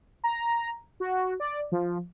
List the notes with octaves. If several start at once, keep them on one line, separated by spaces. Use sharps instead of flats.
A#5
F#4
D5
F3